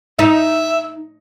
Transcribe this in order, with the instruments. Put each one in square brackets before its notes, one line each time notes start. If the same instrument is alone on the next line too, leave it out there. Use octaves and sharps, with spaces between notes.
[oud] D#4 [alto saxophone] E5